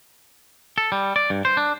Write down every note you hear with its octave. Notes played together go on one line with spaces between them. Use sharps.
A4
G3
D5
G2
C5
D4